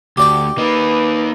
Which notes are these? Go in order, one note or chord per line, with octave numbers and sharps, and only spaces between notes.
D2 G4 D5 G5
A#3 D#4 B4